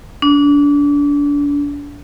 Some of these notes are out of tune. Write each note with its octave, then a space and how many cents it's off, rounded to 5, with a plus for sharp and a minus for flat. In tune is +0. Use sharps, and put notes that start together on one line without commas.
D4 -30